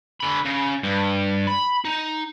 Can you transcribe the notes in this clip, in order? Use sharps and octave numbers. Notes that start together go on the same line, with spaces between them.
D3 B5
C#3
G2
B5
D#4